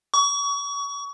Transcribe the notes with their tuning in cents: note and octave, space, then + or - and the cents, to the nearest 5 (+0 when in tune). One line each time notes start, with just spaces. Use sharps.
C#6 +30